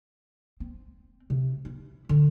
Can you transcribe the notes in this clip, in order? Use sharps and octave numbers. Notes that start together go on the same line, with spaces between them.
C4
C3
E4
D3